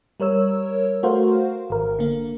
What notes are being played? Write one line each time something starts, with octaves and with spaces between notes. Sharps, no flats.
G3 A#4 C#5 E6
A3 F#4 A#4 C5 F5
G#1 A#4
D3 A#3